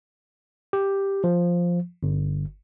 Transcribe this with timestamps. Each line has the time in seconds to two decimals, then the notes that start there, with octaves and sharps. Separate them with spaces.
0.73 G4
1.24 F3
2.03 G1